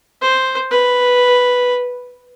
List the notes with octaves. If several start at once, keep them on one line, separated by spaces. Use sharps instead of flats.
C5
B4